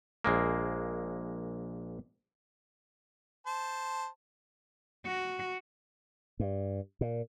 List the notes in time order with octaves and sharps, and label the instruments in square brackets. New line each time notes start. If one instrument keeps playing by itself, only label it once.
[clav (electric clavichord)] A#1 G#3 A#3
[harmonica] C5 A5
[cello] F#4
[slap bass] G2
A#2